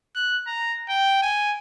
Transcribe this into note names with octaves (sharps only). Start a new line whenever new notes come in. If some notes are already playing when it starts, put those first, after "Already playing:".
F#6
A#5
G5
G#5